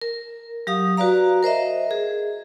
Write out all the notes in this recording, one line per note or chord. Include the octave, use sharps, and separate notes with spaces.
A#4
F#3 G4 F5 D#6
F#4 B4 D5 F5 A#5
A#4 C5 D#5 E5
G#4